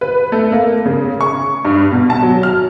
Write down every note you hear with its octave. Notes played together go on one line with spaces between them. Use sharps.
B4
A3
A#3
C#3
C#6
G2
B2
A5
F#3
F6